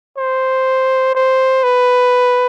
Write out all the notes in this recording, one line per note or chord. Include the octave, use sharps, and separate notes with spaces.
C5
C5
B4